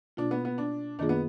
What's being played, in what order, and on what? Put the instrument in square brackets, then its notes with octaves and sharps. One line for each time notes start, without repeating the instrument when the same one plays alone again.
[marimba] B2 A#3 F4 [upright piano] D4
[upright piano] B3
B3
D4
[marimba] F#2 D#3 A#3 F4 G#4 [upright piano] D4
[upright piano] B3